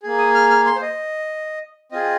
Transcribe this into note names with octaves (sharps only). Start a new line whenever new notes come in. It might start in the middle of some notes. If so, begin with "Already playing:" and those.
A#3 G#4
D#6
F6
F6
C6
C5
D#5
C4 F4 G#4 D#5